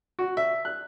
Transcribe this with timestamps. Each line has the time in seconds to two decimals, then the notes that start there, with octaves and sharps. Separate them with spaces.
0.19 F#4
0.37 E5
0.65 F#6